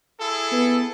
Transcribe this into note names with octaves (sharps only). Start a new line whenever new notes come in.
E4 G#4 A4
B3